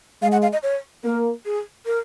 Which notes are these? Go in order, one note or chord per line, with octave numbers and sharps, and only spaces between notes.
G#3 F5
F#5
F5
D#5
C#5
A#3 A#4
G#4
A#4